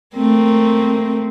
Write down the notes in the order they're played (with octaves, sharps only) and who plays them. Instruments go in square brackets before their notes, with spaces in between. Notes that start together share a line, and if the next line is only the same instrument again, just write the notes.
[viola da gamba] A3 A#3 C4